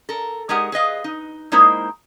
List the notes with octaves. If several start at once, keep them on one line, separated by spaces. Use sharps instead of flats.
A4 A#4
G#3 D#4 G4 G#4 A#4 F#5
G#4 B4 D#5 F5
D#4
G#3 A#3 D#4 E4 A#4 C5